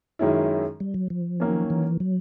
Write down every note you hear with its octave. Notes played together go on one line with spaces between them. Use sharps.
F#2 D#3 G#3 C#4 E4
G3
F#3
F3
D#3 F#3 A#3 C#4
E3
F#3